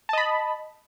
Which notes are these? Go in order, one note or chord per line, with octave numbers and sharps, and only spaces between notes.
D#5 A5 B5